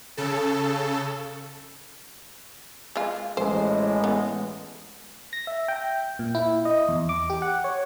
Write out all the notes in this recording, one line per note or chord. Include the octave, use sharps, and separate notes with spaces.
C#3 A4
G#3 F4
A1 G#3 C5
B3
A#6
E5
G5
A#2
E4
D#5
E2
D6
G4
F#5
C#5